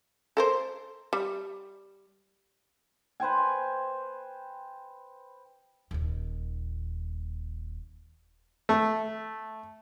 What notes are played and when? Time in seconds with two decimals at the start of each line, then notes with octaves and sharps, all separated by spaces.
0.37 A4 A#4 C5
1.13 G3
3.20 B4 C5 G5 G#5
5.91 D#1 D#2
8.69 A3